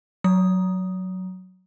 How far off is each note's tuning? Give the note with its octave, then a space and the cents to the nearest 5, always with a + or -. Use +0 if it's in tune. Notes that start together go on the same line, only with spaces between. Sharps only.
F#3 +0 D#6 +0